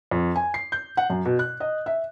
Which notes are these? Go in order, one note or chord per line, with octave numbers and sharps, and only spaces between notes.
F2
G#5
C7
G6
F#5
F#2
B2
F#6
D#5
E5